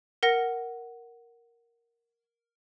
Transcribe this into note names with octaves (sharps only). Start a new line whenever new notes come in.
A#4 F#5 A#6